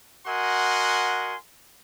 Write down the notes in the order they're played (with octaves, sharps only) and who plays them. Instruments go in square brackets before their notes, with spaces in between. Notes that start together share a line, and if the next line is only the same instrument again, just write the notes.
[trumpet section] F#4 A#4 D#5 F#5 G#5 C6